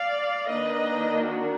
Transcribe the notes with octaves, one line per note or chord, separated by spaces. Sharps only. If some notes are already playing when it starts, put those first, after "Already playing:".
Already playing: D5 F5
D#3 A#3 D4 B4 D#5
F#4 A#4